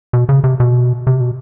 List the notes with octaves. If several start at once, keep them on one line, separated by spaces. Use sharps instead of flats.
B2
C#3
C3
B2
C3
B2